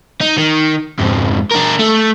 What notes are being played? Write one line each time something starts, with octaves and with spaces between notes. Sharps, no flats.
D#4
D#3
F2 G#2
D4 A#4
A3